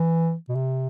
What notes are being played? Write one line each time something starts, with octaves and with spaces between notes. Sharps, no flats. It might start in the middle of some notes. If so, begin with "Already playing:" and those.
Already playing: E3
B2
C3